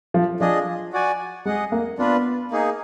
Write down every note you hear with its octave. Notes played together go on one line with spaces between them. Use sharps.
F3
F3 D4 G#4 D#5
F#4 D5 G#5
G#3 G#4 D#5 F#5
A#3
B3 D4 F4 B4
A#3 D#4 G#4